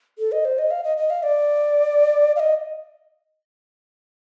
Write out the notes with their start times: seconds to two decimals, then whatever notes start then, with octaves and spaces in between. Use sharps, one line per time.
0.19 A4
0.32 D#5
0.45 C5
0.58 D#5
0.71 F5
0.84 D#5
0.97 D#5
1.10 F5
1.23 D5
2.36 F5
2.40 D#5